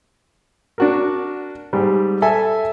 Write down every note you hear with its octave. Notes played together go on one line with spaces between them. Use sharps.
D4 F#4 A#4
G#2 G3
A4 E5 G#5